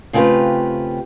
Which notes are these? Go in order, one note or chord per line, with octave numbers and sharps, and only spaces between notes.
C#3 A3 C4 F4 G4 B4